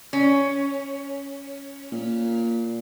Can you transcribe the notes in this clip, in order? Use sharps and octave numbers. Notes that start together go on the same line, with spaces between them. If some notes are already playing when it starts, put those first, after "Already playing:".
C#4
A#2